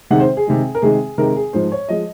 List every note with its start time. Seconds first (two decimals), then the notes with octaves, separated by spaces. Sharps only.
0.11 C3 D#3 G#3 F#5
0.20 C5
0.37 G#4
0.47 C3 D#3 G#3
0.75 A#4
0.82 C3 D#3 G#3 G#4
1.18 C3 D#3 G#3 A#4
1.36 G#4
1.53 G#2 F3 G#3 C5
1.72 C#5
1.89 F3 G#3 D#5